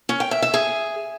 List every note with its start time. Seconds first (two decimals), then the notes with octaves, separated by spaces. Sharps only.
0.09 C#4
0.20 G5
0.31 E5
0.42 E5
0.54 G#4